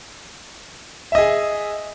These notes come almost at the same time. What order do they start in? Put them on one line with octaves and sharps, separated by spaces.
E5 D#5 G#4 G#5